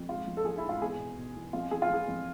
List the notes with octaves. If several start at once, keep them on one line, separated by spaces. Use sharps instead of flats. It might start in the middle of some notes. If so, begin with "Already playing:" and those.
Already playing: F2
G#2 F4
F3
A4
F3 G#4
E4
G#2
F4
E2 G#4
B2
B2
E2
F2 F4
E3 G#4
F4
E3 G#4
F2